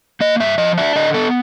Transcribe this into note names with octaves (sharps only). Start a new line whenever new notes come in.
A#3 D#5
G2 E5
F3 D#5
D4 E5
D3 D#5
B3 A4